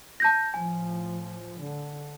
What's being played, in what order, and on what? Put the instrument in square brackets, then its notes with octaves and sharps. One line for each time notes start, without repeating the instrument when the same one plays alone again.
[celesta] A5 G6 A#6
[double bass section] A2 F3 [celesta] G#5
[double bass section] D3